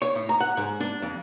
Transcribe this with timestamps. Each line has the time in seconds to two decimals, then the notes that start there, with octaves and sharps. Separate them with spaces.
0.02 C#5
0.15 A2
0.29 A#5
0.40 F#5
0.57 G#2
0.80 D4
1.02 F2